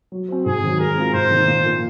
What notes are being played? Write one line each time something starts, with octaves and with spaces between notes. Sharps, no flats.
F#3
C4 F#4 C5
G#2 G#4
D#3 F#3
G#3 A#4
C4 F4
G#2 C5
D#3 A#3 D#4
A#2
F3 A#3